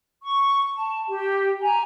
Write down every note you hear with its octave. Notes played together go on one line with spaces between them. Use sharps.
C#6
A5
G4
G#5 A#5